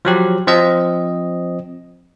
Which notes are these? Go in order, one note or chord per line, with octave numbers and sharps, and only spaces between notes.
F3 F#3 G4
F3 C4 D#5